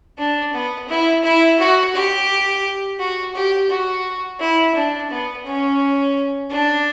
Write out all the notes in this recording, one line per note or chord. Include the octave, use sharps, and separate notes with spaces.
D4
B3
E4
E4
F#4
G4
F#4
G4
F#4
E4
D4
B3
C#4
D4